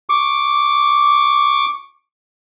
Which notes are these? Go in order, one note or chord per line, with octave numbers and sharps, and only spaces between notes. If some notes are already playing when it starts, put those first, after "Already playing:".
C#6 D6